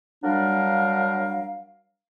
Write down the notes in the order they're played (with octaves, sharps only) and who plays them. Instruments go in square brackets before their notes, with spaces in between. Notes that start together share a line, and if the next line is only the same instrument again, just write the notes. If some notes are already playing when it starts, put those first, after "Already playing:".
[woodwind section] F#3 G3 D4 A#4 F5